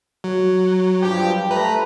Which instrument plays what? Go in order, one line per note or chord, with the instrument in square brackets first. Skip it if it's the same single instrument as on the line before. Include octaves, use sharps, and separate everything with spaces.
[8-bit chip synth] F#3
[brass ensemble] G2 F3 G4
[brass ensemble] A3 A#5 [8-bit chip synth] B4